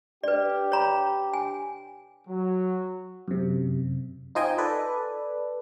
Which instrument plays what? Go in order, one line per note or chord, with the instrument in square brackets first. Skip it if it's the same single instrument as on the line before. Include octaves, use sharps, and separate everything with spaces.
[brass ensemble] D4 G4 [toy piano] B4 D5
[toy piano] C#5 A#5 B5
G#5
[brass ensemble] F#3
[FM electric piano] F#2 C3
D#4 F4 C5 D#5 G5 G#5
A4 B4 D5